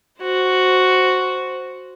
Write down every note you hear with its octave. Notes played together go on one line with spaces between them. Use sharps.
F#4 C5